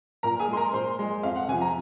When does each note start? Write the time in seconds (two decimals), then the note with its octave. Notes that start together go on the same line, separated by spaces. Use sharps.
0.23 A#2 A#4 A#5
0.39 G#4 G#5
0.48 G#3
0.53 C6
0.57 A#4 A#5
0.73 A#2 C5 C6
0.99 G#3
1.23 F2 F5
1.36 F#5
1.48 C3 F3 G#5
1.61 A#5